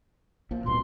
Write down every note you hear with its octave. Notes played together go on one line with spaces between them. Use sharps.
A#1 A#2 F3
D#1 C2 B2 C6